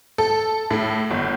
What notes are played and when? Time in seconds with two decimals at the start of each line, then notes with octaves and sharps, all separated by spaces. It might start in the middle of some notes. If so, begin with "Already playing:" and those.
0.18 A4
0.71 A2
1.11 G1